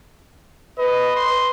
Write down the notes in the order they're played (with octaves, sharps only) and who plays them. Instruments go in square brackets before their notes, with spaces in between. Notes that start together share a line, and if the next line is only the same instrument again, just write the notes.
[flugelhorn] B4 [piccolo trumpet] D#5
[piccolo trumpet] C6